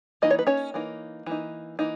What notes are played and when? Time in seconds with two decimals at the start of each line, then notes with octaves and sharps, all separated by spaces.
0.22 E3 A#3 D#4 D#5
0.31 C#5
0.39 B4
0.47 C#4 C#5
0.74 E3 A#3 D#4
1.26 E3 A#3 D#4
1.79 E3 A#3 D#4